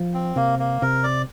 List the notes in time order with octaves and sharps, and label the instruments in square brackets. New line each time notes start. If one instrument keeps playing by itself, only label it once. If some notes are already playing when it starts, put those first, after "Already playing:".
Already playing: [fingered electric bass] F3
[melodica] C4
[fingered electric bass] C3 [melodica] A#3
[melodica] A#3
[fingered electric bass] C3 [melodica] A#4
[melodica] D5